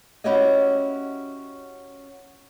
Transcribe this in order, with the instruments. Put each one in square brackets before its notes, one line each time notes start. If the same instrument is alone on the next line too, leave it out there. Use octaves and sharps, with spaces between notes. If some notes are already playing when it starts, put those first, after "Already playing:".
[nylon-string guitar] C#4 E4 F#4 G4 C#5 D#5